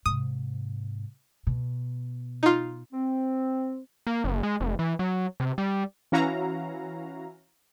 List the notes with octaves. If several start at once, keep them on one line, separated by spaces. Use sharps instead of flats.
G#2 C3 D#6
B2
D#4 F4
C4
A#3
F#1
G#3
F1
E3
F#3
C3
G3
E3 C#4 E4 F#4 F5 A#5